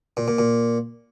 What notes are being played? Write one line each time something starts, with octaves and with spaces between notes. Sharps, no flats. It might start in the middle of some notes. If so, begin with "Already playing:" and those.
A#2
A#2
A#2